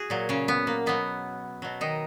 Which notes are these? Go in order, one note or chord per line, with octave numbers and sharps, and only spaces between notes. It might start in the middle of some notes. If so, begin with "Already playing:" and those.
Already playing: F#4 G#4
A#2 F#3
C#3 C#4
B3
A#3
B2 F#3 B3
B2 F#3
D#3 D#4